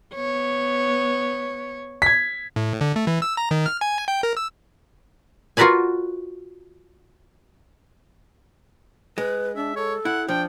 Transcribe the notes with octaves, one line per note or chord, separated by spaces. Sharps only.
B3 C#5
G#6 B6
A2
D3
A3
E3
E6
A#5
D#3
F6
G#5
G5
A#4
E6
F4 F#4 A#4 B4 D5 G#5
G#3 B4
D4 E5
A4 C#5
E4 F#5
F3 D4 G5